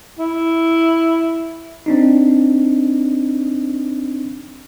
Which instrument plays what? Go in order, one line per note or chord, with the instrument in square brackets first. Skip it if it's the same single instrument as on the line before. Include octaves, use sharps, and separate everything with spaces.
[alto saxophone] E4
[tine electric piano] C4 D4 D#4